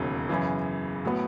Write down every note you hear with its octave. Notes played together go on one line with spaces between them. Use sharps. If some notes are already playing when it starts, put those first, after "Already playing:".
Already playing: E1 D#2 C#3 F#3 A#3
F#2 C#3 E3
A2 F#3 B3